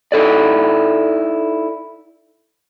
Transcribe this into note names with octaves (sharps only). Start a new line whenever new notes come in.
D#4 E4 A4 D5